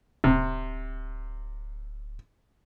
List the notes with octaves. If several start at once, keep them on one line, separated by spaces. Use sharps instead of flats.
D1 C3